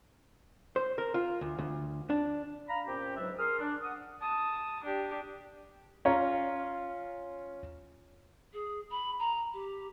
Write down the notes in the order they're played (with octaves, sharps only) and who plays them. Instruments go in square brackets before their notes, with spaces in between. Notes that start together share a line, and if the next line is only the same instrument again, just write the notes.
[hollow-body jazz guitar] C5
A#4
F4
D2
D2
D4
[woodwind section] F5 A#5 B5
A#2 C4 C#4 G4
C#2 G#2 F#3 D4 E5
G#4 A#4 C6 D#6 F6
D4
F#5 D#6
[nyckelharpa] A5 D#6
D4 G4
[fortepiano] C#4 F4 C#5 A#5
[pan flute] G#4
B5
A#5
G4